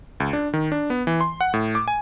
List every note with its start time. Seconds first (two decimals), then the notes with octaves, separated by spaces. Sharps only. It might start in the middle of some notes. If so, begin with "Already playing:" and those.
0.20 C#2
0.33 D4
0.53 D#3
0.72 D4
0.90 B3
1.07 E3
1.21 C6
1.41 F#5
1.54 A2
1.75 D6
1.88 G#5